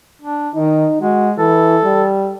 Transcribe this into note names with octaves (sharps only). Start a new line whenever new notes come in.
D4
D#3 D#4
G#3 F#4
E3 A4
G3